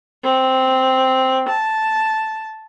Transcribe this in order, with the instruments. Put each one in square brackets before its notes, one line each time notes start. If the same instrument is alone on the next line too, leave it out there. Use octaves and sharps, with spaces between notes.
[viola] C4
A5